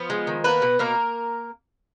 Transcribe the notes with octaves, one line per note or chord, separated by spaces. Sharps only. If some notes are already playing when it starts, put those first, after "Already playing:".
Already playing: F3 B3 F4
G#3
D#3
A#3 B3 B4
B2
B2 A#3 A#4